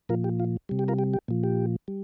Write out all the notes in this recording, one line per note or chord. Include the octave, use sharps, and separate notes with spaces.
A#2 F3 F4 A#4
G4
F4
C3 G3
G4
F4 A#4
G4
G4
A#2 F3
G4
G3